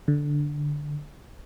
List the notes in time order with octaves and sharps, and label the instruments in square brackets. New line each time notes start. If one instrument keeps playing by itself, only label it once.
[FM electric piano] D3